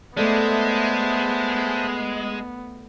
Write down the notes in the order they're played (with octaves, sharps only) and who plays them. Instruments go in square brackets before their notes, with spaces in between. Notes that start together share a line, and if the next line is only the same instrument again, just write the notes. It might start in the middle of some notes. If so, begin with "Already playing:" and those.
[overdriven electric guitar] G#3 [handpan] A3 A4 D5 [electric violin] B3 [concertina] C5 E5 A5